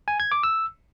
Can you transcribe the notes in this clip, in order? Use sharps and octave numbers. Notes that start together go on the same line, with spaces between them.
G#5
G#6
D6
E6